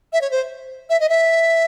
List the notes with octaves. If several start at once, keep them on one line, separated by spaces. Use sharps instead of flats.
E5
C#5
C5
E5
D#5
E5